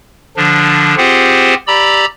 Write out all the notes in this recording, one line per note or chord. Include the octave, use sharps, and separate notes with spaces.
D3 F3 D4
C4 F4 G4 G#4 C5 F#5
G4 D5 A#5 B5 E6